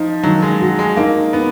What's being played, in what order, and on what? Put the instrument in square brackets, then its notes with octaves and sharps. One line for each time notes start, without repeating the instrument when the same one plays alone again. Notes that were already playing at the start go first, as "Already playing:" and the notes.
Already playing: [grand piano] F3 [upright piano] D#4
[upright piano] D#3 [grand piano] F#3
[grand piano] G#3
[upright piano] F#4
[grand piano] G#3
[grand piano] A#3 [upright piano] D#4
[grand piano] B3 [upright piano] D#4